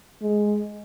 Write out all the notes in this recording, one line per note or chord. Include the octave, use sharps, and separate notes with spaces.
G#3